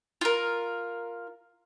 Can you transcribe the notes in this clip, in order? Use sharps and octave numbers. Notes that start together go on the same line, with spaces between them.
F4 A#4